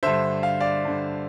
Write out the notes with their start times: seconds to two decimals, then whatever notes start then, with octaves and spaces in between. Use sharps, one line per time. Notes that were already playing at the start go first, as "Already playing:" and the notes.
0.03 G2 D3 C5 E5
0.43 F5
0.60 D5 F5
0.85 G2 D3